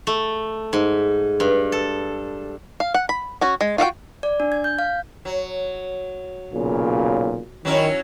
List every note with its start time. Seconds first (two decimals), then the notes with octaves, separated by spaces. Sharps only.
0.07 A3
0.73 G#2
1.40 G2
1.72 A4
2.80 F5
2.94 F#5
3.09 B5
3.41 C#4 F#4
3.61 G#3
3.78 F4 F#4 F5 G5
4.23 D5
4.40 D4
4.52 G#6
4.64 G6
4.79 F5
5.25 F#3
6.53 B1 A#2 C#3
7.65 D#3 F#3 C#4 E4